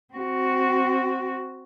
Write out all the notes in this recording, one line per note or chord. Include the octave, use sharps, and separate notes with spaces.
C4 F#4